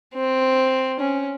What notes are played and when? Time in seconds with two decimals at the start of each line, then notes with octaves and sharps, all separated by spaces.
0.14 C4
0.99 C#4